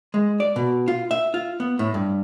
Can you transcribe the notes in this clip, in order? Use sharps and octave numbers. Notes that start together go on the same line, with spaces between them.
G#3
D5
B2
F4
E5
F4
B3
A2
G2